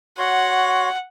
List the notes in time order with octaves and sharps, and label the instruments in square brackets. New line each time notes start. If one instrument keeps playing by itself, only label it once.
[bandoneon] F#4 C#5 C6 [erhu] F#5